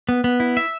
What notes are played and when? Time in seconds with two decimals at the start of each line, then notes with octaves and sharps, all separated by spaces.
0.09 B3
0.24 B3
0.40 E4
0.57 E5